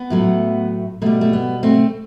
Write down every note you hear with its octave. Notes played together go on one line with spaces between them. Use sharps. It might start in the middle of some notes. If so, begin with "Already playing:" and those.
Already playing: B3
A2 F#3 A3
B2 G3 A3
A3
B3
A3 C4